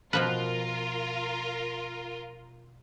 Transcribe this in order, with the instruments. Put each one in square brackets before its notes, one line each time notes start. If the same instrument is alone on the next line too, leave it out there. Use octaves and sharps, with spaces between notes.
[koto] B2 F3 B4 [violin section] F4 A#4